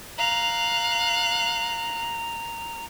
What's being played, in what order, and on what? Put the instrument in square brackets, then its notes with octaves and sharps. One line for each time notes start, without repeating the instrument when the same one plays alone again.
[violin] F5 F#6 [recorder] A#5